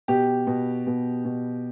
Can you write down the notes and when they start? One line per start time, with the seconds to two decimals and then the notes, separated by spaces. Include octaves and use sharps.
0.08 B2 G4
0.47 B2
0.87 B2
1.25 B2